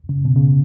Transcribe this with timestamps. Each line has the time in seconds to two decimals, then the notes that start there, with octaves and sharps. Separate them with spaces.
0.09 C#3
0.25 B2
0.36 C#3